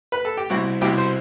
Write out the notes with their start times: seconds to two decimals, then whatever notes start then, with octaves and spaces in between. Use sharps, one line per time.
0.12 B4
0.25 A4
0.37 G4
0.50 C2 B2 G3 C4 E4 F#4
0.81 C2 B2 G3 C4 E4 G4
0.98 C5